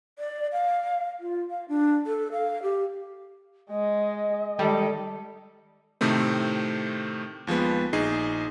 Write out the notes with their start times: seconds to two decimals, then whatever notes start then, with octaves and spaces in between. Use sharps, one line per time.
0.19 D5
0.52 F5
1.20 F4
1.50 F5
1.69 D4
2.06 A4
2.32 F5
2.63 G4
3.70 G#3 D#5
4.59 D#3 G3 G#3 A4
6.01 A2 C3 D#3 A3 C4
7.47 D#2 F3 G#3 B3
7.93 A#1 D#4 G#4 C7